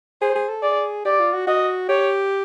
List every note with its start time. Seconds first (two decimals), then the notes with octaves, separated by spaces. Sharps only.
0.21 G#4 C5
0.35 G#4
0.49 A4
0.63 G#4 D5
1.05 G4 D5
1.20 F4
1.33 F#4
1.47 F#4 D#5
1.89 G4 C#5